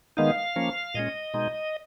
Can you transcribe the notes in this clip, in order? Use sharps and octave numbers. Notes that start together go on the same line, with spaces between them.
D#3 G#3 B3 D#4 F5
F3 A#3 C#4
A#2 G#3 C#4 D#5
B2 G#3 D#4